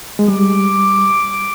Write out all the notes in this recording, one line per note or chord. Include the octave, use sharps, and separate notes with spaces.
G#3
G3 D6